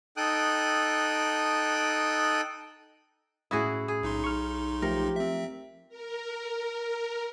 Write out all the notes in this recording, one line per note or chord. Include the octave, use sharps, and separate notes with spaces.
D#4 A4 G5 D#6 F#6
A2 C#4 E4 F#4 G#4 D#6
G#4
B1 D#4 C6
C#6 F6
F3 A3 G4 A#4
C4 E5
A#4